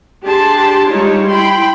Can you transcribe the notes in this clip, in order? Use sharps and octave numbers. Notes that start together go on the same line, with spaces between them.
D4 G4 G#4 A5 C6
G3 G#3 D#4 F4 C#5
E4 G5 B5 C6